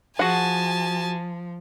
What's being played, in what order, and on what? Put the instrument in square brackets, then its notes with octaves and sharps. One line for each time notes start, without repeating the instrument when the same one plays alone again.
[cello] F3 [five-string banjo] F#4 G#4 F#5 [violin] G#5 A5